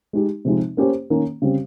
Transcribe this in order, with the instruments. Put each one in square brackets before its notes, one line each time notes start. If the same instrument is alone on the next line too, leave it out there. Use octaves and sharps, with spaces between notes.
[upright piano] G#3 D#4 G4
C3 F3 G#3 C4 D#4
A#3 C#4 G4 C5
D#3 A#3 C#4
C#3 G3 C4